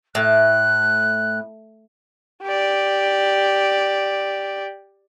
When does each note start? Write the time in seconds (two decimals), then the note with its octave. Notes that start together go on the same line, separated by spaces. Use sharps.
0.15 A2 F#6
2.43 G4 D5